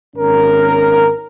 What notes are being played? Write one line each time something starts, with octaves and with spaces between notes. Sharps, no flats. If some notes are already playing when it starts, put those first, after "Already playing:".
G#1 C#4 A#4